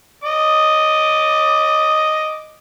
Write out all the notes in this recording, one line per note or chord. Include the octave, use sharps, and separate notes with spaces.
D#5 D6